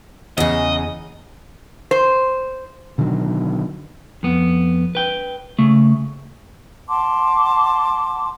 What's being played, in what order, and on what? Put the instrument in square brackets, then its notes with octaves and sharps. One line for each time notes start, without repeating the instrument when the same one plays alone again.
[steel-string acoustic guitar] E2 C#3 [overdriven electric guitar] D#5
[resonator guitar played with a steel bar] C5
[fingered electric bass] B2 D3 D#3 F#3
[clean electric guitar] F2 B3
B4 G5
C#3 A3
[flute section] F#5 A5 C6 D6